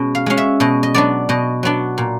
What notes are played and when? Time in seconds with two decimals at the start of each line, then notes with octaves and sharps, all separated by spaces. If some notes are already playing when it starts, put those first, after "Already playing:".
Already playing: B2 G#3 C#4
0.15 F5
0.26 G#3 C#4 F5
0.37 E5
0.60 B2 D#5
0.83 D#5
0.94 F#3 B3 D4 D5
1.29 B2 D#5
1.63 F#3 B3 D4
1.98 A#2